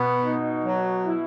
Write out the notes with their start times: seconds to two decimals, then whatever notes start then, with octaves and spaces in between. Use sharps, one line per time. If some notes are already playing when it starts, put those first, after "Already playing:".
Already playing: B2 B3
0.25 D#4
0.65 F#3
1.06 E4